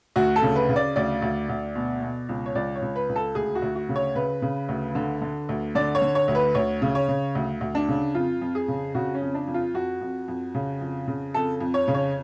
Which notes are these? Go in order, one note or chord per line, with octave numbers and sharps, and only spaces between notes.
D2 F#4
A4
C#3
B4
C#3
D5
D2 D5
D2
D2
B2
B2
C#2
C#5
C#2 D5
C#5
C#2
B4
C#2
A4
D2 G#4
F#4
D2
F#4
C#3
C#5
C#3 B4
C#3
D2
D3
D3
D2
D3 D5
C#5
D3
C#5
D2
B4
D2 C#5
C#3
C#5
C#3
D2
D2
D4
C#3
F2 F4
F2
G#4
C#3
C#3 F#4
C#4
F2
D4
F2
F4
F2 F#4
F2
F2
C#3
F2
C#3
F2 A4
F2
C#5
C#3
C#5